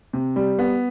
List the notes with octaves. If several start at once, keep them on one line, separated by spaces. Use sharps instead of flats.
C3
G3
B3